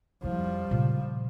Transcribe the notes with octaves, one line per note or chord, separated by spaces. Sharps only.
F2 F3 G3 E4
A#2 C#3